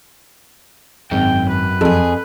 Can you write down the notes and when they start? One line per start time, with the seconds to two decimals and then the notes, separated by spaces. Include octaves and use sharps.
1.11 G#1 F#2 G5
1.49 B4
1.81 F2 G#4 A4